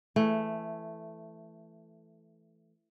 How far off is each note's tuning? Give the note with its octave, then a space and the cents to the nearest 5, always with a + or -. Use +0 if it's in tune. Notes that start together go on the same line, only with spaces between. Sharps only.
E3 +15 A3 +0